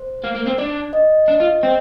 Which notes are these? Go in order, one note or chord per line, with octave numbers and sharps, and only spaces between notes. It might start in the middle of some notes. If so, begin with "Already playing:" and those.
Already playing: C5
A#3
A#3
C4
D4 D5
D#5
D4
F4
C4